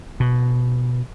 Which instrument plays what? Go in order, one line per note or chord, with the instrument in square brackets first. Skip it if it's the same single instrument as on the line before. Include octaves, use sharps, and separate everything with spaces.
[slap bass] B2